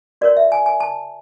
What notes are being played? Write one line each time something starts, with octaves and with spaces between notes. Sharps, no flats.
F#4 A#4 C#5 D5
E5
G#5
G#5
A5